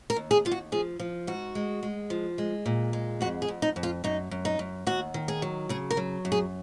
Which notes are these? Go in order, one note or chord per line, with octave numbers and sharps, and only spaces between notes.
A#4
D#2
G#4
D#2 F4
F#4
F3 G#4
F3
G#2 F#4
G#3
G#3
F3
G#3
A#2
G#3
F2 F#4
G#4
F2
D#4
F2
F4
F#2 D#4
F#2
D#4
F#2
D#2 F#4
D#3
G#4
F#3
C#3 G#4
A#4
F#3
F#2
G#4